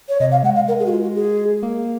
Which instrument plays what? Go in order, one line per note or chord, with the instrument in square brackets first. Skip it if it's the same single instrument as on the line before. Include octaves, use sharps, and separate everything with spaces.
[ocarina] C#5
[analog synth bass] C3 [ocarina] D#5
[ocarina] F5
[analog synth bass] G#3 [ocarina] F#5
[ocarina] F5
A#4
G#4
F#4
F4
F#4
G#4
[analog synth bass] A#3